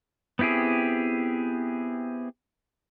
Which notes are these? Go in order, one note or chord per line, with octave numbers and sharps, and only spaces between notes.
B3 C4 E4 G4 G#4